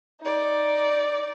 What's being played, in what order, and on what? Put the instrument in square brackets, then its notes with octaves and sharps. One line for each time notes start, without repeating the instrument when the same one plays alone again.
[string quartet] D#4 D5